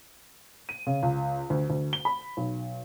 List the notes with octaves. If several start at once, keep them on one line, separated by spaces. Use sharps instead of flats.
D#7
C#3
C#2
D2
D2
G7
B5
B1